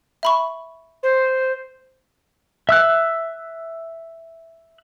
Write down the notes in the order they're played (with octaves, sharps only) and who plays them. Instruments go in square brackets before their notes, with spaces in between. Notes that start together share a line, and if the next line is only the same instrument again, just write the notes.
[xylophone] E5 B5 C#6
[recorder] C5
[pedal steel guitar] E5 E6 F#6